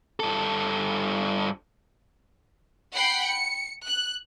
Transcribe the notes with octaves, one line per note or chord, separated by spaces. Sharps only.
G2 A4
F#5 G5 B5 C7
C#7
F#6